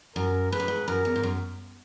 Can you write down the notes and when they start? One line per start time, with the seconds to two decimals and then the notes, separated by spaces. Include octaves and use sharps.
0.15 F#2 A#4
0.52 G#2 B4
0.60 F#2
0.68 G#2
0.88 F#2 A#4
1.05 E2
1.16 G#2
1.23 F#2